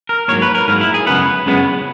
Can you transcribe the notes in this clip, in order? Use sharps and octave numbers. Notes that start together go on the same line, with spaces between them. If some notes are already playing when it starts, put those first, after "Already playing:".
A#4
G#2 F#3 A#3 C#5
B4
A#4
G#2 F#3 A#3 A#4
E4
G#4
F#2 C#3 G#3 B3 B4
F#2 C#3 G#3 B3